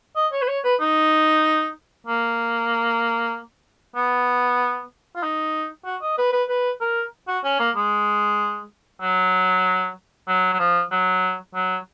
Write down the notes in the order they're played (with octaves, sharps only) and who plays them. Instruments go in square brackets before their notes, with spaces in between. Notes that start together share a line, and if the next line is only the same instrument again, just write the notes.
[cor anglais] D#5
C#5
B4
C#5
B4
D#4
A#3
B3
F4
D#4
F#4
D#5
B4
B4
B4
A#4
F#4
C#4
A#3
G#3
F#3
F#3
F#3
F3
F#3
F#3